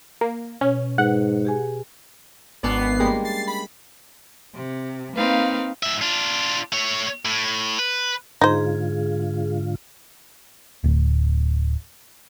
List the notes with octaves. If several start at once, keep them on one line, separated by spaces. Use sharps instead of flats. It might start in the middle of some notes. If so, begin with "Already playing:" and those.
A#3
B2 C#4
G#2 B4 F#5
G4 G#4 G#5
G#1 B3 C#4 D4 D5 C7
G3 G#3 A#3
A6 C7
B5
C3
A#3 C4 D#4 B4 F5
G#2 E5
D4 F4
A3 C#5
A2
B4
G#2 D3 D#4 F4 G#4 C5
D1